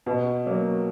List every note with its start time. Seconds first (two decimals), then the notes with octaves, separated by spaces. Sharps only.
0.06 B2
0.46 F#3 A#3